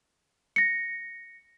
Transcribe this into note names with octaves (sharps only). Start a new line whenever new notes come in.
A#6 C#7